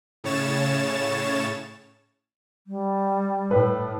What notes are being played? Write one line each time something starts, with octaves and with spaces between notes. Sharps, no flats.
A2 C#3 C#5 A6 E7
G3
A2 B4